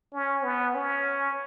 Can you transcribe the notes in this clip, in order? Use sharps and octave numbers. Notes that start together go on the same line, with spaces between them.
C#4
B3
C#4